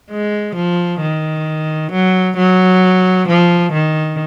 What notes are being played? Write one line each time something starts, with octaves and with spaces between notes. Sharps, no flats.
G#3
F3
D#3
F#3
F#3
F3
D#3